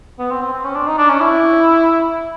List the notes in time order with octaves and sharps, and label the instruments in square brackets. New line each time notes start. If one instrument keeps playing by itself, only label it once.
[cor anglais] B3
C4
C4
C4
C#4
D4
D#4
D4
C#4
E4